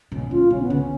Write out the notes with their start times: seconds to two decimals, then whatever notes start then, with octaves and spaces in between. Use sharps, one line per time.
0.12 B2 C#4
0.31 A#2 F4
0.51 B2 C#4
0.62 B3
0.70 C#3 C#4